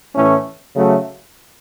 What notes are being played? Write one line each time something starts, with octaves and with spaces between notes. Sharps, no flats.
A2 E3 A3 C#4
C#3 F#3 A3